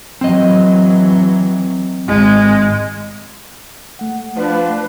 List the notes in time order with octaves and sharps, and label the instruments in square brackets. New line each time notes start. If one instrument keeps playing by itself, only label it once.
[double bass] E3 F#3 [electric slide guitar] C4 D#5
[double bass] G#1 [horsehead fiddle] G#3
[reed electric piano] A3 F#5
[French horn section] F3 D4 [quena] B4